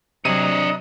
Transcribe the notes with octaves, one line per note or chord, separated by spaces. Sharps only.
C3 F#3 D4 C#5 D#5 A#5 D#7